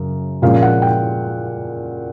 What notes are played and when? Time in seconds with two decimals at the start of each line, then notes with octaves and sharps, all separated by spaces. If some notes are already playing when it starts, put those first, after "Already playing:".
Already playing: F#2 C#3
0.42 A#2 F3 G#3 C#4 F5
0.62 F#5
0.82 G5